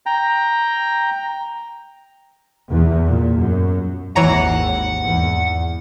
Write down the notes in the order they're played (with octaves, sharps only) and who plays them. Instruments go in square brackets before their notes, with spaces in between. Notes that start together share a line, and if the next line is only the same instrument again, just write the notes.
[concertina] G5 A#5
[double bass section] E2
A#2
F#2
[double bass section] G#1 D#2 [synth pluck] E3 C#5 A#5 [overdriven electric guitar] F#5
[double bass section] E2